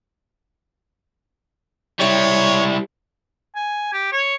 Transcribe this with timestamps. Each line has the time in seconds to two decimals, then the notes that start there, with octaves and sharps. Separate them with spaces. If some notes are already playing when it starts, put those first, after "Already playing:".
2.00 G3 E4 C#5
3.56 G#5
3.93 G4
4.12 C#5